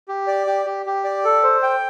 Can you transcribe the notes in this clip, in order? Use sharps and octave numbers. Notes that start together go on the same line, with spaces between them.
G4
D5
G4
G4
G4
D5
A4
C5
G5